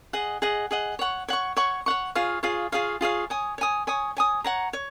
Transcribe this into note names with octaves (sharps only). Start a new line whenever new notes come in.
G#4 D#5 F#5
G#4 D#5 F#5
G#4 D#5 F#5
C#5 F#5 C#6
C#5 F#5 C#6
C#5 F#5 C#6
C#5 F#5 C#6
F4 G#4 C#5 F5
F4 G#4 C#5 F5
F4 G#4 C#5 F5
F4 G#4 C#5 F5
C#5 G#5 D#6
C#5 G#5 D#6
C#5 G#5 D#6
C#5 G#5 D#6
C#5 F#5 A#5
C#5